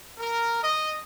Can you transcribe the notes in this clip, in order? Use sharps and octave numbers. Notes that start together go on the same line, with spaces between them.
A#4
D#5